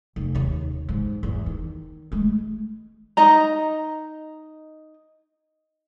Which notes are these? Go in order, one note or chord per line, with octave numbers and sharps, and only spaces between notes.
F1
D#2 C#3
G#2
E2
D#3
G#3 A3
D#4 D#5 A#5